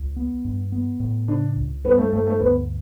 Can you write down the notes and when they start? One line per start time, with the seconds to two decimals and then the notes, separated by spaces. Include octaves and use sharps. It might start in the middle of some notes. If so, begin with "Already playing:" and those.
Already playing: C#2
0.16 B3
0.45 G2
0.72 B3
1.00 A2
1.28 C#3 D4
1.56 C#2
1.84 G2 B3
1.98 A3
2.13 G2 A3
2.27 A3
2.40 D2 B3